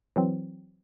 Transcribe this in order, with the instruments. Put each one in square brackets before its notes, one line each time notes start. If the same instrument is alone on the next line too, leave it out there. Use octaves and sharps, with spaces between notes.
[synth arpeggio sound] E3 F#3 C4